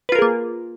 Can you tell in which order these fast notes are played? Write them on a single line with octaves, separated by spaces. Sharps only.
B4 F4 A#4 G#4 A#3